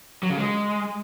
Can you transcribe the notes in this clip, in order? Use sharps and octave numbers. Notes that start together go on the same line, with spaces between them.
F#3
C#3
G#3